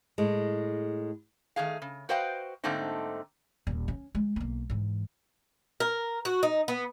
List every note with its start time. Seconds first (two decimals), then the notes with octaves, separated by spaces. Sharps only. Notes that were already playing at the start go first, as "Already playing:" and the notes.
0.18 A2 G#3
1.56 D#3 A3 G#4 F5
1.82 C#3
2.09 F#4 B4 C5 D#5 F5 G5
2.64 G#2 D3 A3 A#3 C4 D#4
3.67 D#1 A#2
3.88 C#4
4.15 G#3
4.36 B1 A#3
4.70 G#2 E3
5.80 A#4
6.25 F#4
6.43 D#4
6.68 B3